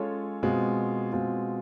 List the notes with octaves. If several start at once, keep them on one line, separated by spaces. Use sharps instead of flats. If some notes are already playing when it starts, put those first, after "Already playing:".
Already playing: G#3 C#4 F4 A4 C#5
B2 G#3 C4 F4
B2 G#3 C4 F4